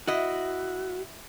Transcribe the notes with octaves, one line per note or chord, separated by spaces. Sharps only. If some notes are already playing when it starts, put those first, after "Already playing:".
E4 F#4 D#5